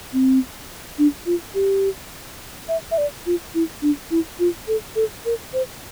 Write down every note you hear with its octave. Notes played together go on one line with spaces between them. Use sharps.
C4
D4
F4
G4
E5
E5
D5
F4
E4
D4
E4
F4
A4
A4
A#4
C5